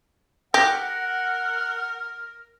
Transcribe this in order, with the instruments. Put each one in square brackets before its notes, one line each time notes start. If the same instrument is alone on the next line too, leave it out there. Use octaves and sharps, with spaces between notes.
[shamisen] G4 [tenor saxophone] A#4 [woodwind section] F#5 [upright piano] A#6